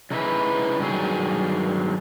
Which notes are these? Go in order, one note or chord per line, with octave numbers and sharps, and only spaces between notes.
C#3 D#4 E4 B4
G2 D#3 F#3 G#4